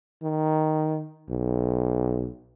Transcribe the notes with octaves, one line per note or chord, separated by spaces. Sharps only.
D#3
B1